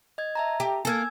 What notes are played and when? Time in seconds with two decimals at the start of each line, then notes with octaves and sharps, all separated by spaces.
0.18 D#5 G#6
0.35 E5 A5 A#5
0.60 G4
0.85 A#3 A4 G#5 E6 G#6